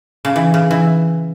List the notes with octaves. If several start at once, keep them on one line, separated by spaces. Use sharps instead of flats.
C#3
E3
C#3
E3